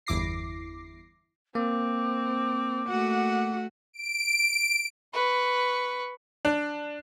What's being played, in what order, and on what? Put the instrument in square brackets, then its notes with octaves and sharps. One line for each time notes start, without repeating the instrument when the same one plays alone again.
[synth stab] G1 E2 E4 D6 A#6 C7
[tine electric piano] A#3 [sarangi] C4 [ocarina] D6
[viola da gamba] A3 F#4 [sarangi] F#5
[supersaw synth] D7
[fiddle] B4 C#6
[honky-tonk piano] D4